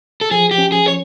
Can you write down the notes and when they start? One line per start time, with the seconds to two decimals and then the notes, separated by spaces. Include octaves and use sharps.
0.21 A4
0.31 F3 G#4
0.51 G4
0.58 C#4
0.72 G#4
0.88 C#5